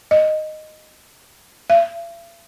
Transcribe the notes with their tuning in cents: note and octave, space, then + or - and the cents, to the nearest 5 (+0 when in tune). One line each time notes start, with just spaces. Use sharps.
D#5 -10
E5 +45